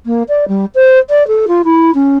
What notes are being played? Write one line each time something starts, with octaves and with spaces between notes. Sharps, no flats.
A#3
D5
G3
C5
D5
A4
F4
E4
C#4